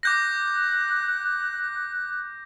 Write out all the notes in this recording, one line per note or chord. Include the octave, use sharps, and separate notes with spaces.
D6 F#6 G6 A#6